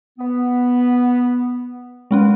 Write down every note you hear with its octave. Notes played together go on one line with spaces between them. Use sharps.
B3
G#3 C4 C#4